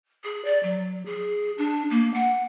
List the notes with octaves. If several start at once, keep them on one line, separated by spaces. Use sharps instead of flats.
G#4
D5
F#3
G#4
D4
A#3
F#5